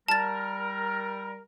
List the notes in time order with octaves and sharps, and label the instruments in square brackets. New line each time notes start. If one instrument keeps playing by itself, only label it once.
[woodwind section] G3 A#4 [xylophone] A5 A6